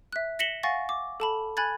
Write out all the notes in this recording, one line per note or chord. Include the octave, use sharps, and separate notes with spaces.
E5 F#6
A#6 B6 C#7 E7 F#7 G7
F5 F#5 G#5 C#6 A6 A#6
D6
A4 A5 B5
G#5 B5 F#6 G#6 A6